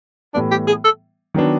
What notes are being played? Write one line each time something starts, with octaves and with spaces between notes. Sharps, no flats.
A2 E3 G3 B3 D4
G4
G#4
A4
D#3 F#3 B3 D4